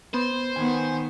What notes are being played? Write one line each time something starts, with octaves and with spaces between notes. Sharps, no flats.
B3 C5
D#3 B3 G#5